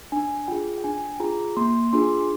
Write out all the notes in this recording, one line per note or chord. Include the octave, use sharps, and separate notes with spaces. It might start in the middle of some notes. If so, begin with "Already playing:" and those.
D4 G#5
F4 G#4 G5
G5
D4 G#5
F4 G#4 A#5
A#3 C6
D4 F4 G#4 C6